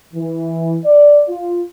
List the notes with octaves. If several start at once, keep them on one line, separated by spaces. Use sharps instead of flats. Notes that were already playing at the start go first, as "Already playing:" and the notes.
E3
D5
F4